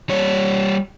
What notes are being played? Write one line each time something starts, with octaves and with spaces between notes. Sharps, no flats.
G3 C#5